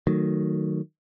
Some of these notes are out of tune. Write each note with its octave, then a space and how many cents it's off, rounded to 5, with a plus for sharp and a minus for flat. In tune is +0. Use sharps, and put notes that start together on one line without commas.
D#3 +0 F#3 +0 A3 +15